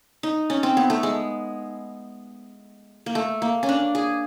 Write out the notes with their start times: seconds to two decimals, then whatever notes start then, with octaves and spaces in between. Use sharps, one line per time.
0.23 D#4
0.50 C#4
0.63 C4
0.77 B3
0.90 A3
1.03 G#3
3.06 A#3
3.15 A3
3.42 A#3
3.63 C#4
3.69 D4
3.95 G#4